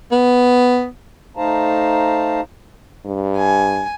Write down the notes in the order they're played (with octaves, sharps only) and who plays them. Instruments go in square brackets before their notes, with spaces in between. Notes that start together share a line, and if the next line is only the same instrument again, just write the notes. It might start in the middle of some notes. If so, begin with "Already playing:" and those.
[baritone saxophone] B3
[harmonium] A3 D#4 C5 F5 A5 A#5
[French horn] G2
[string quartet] G#5